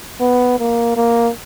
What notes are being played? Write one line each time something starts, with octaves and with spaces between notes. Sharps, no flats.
B3
A#3
A#3